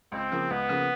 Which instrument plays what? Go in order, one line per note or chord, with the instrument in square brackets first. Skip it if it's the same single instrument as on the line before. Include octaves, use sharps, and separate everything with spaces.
[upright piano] C#2 [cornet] C4
[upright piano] C#3 F3 A#3
[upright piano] C#2 [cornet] B3
[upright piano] C#3 F3 A#3